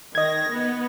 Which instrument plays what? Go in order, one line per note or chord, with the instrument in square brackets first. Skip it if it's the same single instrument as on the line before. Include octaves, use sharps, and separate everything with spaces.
[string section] D#3 A#6 [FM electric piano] D#5 G#6
[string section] B3